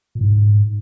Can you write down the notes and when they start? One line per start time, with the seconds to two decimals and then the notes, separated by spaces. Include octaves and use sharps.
0.15 A#2
0.21 G#2